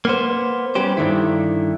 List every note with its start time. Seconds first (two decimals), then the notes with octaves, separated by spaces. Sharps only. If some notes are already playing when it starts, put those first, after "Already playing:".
0.05 A#3 B3 C5
0.75 G3 B3 C#4 G4 C5
0.97 G2 D3 D#3 E4